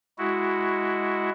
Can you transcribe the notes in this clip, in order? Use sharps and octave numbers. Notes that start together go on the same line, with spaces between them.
G#3 E4 F#4